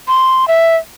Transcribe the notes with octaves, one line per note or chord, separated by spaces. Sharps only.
C6
E5